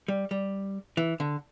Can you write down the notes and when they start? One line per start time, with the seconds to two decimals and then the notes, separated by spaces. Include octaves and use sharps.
0.08 G3
0.31 G3
0.97 E3
1.20 D3